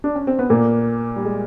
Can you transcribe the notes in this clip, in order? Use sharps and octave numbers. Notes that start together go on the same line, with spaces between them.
D4
C#4
C4
B3
A#2 A#3
G3
G#3